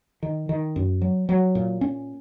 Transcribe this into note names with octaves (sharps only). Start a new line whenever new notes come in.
D#3
D#3
F#2
F#3
F#3
A#2
C#4